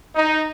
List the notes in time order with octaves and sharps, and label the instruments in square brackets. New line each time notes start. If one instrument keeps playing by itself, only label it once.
[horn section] D#4